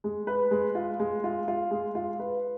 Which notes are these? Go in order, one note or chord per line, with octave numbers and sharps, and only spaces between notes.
G#3
B4
G#3
F4
G#3
F4
F4
G#3
F4
B4